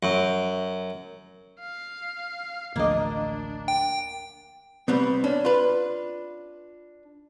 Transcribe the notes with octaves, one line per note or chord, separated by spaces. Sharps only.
F#2
F5
A1 D2 F3 A#3 D4 D#5
G5
C2 G3 B3 C4
C#4 D4
F4 B4